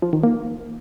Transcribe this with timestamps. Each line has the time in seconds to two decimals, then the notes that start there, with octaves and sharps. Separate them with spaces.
0.02 F3
0.13 D#3
0.23 A#3